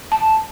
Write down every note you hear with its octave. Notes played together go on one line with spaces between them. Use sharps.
A5